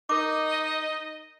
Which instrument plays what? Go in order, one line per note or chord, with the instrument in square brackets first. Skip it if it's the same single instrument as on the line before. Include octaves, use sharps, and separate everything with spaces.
[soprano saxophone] D#4 [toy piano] A#4 D6 [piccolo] D#5